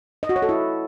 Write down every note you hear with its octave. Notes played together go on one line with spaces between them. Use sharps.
D#5
F#4
C#5
A4
E4